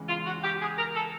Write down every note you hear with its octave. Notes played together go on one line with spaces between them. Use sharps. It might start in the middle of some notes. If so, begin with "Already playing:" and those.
Already playing: E2 C#3 E3 G#3
F4
F#4
G4
G#4
A#4
A4